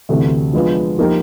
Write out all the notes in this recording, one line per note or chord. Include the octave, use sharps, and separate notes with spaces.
D2 C3 E3 A3
F3 G#3 B3 D4 F4
F3 A#3 D#4 G4 A#4